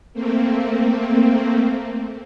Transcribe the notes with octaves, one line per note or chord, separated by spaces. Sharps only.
A3 A#3 C4